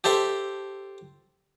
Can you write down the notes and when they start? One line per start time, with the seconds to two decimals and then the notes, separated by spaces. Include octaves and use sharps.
0.04 G4 A4 C5 E5